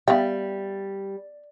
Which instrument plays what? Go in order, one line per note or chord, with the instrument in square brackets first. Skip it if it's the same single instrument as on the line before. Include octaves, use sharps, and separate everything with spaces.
[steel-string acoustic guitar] G3 [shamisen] B3 G5 [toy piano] E5 F5